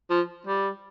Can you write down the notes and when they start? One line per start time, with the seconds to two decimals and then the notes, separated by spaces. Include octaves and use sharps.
0.10 F3
0.47 G3